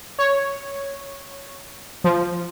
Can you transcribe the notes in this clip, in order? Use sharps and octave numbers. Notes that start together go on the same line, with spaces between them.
C#5
F3